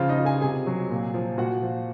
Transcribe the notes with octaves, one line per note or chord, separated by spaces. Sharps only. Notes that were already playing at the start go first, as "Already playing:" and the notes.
Already playing: C#3 F3 F4
D#4 D#5
F3
G#4 G#5
C3 G#4 G#5
F#3
A#2
F3
A#2 F#4 F#5
F3